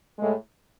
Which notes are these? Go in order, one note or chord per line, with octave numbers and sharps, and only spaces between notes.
A2 G#3